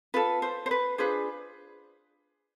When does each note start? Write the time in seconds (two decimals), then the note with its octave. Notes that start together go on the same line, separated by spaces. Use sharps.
0.14 F4 A4 B4
0.42 C5
0.66 C5
0.71 B4
0.98 D4 F4 G#4 B4 C5